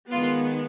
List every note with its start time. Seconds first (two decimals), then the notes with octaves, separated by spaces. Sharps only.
0.11 D#3 G#3 B3 F4